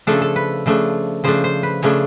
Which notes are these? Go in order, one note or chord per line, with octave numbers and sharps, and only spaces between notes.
C#3 F3 A3 D4 A4
A4
B4
C#3 F3 A3 D4
C#3 F3 A3 D4 C5
C5
B4
C#3 F3 A3 D4 C#5